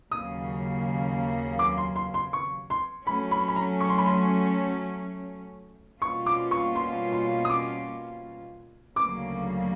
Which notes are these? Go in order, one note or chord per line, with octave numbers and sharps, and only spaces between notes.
D#2 C#3 F#3 A#3 D#6
D6
C6
C6
C6
C#6
C6
F#3 A3 C#4 B5
B5
B5
A#5
C#6
C6
B5
C6
B2 G3 A#3 C#4 F4 C#6
D6
C#6
C6
C6
D#6
D6
D2 C#3 F#3 A#3 D6